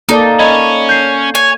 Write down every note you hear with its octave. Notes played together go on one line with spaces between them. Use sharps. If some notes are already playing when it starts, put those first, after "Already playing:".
A#3 D#4 A4 D5
C#4 C#5 D#5 B5 G#6
G6 C7
C#5 G#5